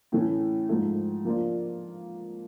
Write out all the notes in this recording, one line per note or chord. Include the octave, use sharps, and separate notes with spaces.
A2 E3 A3 C#4
G#2 F3 A3
F3 A#3 D4 F4